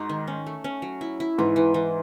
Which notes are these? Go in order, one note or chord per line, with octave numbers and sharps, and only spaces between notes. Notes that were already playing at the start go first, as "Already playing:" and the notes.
Already playing: G#2 D#4 F#4
D#3
C#4
A3
C#4
F#3
E4
E4
G#2 E3
E3
E3